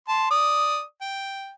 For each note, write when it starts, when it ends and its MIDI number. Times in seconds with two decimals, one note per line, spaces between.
0.08 0.30 81
0.08 0.30 84
0.31 0.82 74
0.31 0.82 87
1.01 1.52 79